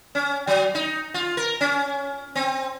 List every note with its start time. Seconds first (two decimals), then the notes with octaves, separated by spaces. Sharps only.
0.15 C#4
0.47 F#3
0.75 D#4
1.14 F4
1.37 A#4
1.61 C#4
2.35 C4